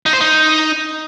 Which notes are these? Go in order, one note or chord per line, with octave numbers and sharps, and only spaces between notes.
D#4
C5
D#4